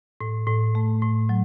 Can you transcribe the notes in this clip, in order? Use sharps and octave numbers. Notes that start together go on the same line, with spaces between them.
A2
A2
A3
A2
F#3